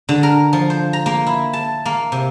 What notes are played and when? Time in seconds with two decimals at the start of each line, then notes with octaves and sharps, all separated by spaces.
0.09 D3
0.23 A#4
0.53 F3
0.70 C5
0.93 A#5
1.06 A#3
1.27 E4
1.53 A5
1.85 A#3
2.12 C3